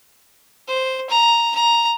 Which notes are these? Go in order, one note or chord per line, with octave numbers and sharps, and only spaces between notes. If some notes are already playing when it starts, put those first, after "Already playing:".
C5
A#5
A#5